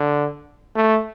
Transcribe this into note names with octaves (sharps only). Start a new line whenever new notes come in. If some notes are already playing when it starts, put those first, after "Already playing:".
Already playing: D3
A3